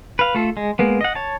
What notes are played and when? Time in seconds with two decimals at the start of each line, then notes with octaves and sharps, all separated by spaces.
0.19 B4 F5
0.35 A3 F4 A4
0.57 G#3
0.79 G#3 A#3 B3
1.01 D#5 F#5
1.15 C#5 A5